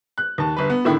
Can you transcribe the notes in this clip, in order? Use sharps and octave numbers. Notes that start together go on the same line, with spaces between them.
F#6
D#2 A5
G1 B4
B3
A2 D3 D#3 E4